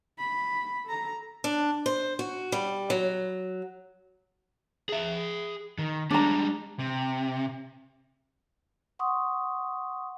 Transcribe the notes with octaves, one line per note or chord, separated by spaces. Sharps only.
B5
A4 A#5
D4
C5
F#4
G3
F#3
G#4 E5
D#3
G3 G#3 D4 A#5
C3
F#5 C6 C#6 D#6